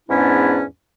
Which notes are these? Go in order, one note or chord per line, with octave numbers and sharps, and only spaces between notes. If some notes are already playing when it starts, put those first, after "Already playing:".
E2 G#2 B3 C#4 D4 E4